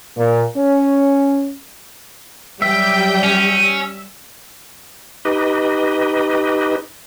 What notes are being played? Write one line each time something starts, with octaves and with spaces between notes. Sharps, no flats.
A#2
C#4
F#3 G3 E5 G5
C#4
D#4 G4 B4 D#5